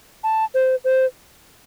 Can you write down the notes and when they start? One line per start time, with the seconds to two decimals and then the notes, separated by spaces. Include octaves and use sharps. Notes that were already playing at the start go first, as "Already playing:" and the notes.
0.24 A5
0.54 C5
0.84 C5